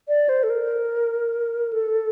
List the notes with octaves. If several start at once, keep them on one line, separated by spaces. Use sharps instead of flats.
D5
C5
A4
A#4
A4